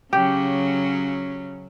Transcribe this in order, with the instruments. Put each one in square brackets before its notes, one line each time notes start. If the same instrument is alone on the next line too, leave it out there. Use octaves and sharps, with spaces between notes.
[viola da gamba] C#3 F#3 C#4 [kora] G4